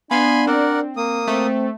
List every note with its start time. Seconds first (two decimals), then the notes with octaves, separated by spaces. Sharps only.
0.11 B3 D4 F5 G#5 B5 C6
0.47 C4 A#4 D5 F#5
0.97 A#3 D#6
1.27 A3 C4